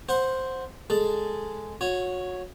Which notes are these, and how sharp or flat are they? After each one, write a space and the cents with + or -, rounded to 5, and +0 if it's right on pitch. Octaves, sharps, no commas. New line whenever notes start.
C5 +0 F#5 -10 C#6 -30
G#3 +0 A4 +0
F#4 -25 C#5 +0